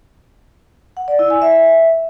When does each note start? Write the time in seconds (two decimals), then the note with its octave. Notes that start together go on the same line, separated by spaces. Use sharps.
0.97 F#5
1.08 D5
1.19 E4
1.30 G#5
1.42 E5